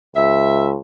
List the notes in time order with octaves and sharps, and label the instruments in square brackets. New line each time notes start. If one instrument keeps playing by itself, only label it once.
[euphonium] C#2 [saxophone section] E5